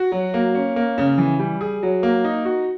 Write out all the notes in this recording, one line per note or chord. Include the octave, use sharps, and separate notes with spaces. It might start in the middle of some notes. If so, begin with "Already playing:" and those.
Already playing: F#4
F#3
A#3
C#4
A#3
C#3
E3
G3
G#4
F#3
A#3
D#4
F#4